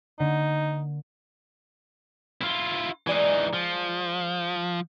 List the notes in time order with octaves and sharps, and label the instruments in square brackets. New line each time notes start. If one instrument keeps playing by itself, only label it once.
[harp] D3 A#3 B6 [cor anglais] D#4
[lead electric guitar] E4 F4
[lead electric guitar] E3 D#4 [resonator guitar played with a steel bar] G#3 D5 G#5
[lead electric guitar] F3